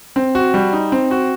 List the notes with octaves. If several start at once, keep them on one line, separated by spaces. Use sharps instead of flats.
C4
F#4
G3
D#4
C4
F#4